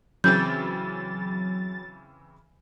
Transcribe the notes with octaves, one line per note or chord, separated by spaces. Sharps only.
C#3 E3 F#3 C4 G6 A6